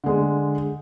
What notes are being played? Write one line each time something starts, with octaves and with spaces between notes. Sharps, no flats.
D3 G#3